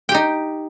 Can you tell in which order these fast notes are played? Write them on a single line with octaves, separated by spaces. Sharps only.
G5 G4 D#4